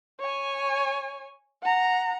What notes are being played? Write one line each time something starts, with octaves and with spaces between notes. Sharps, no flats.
C#5 G#5
F#5 A#5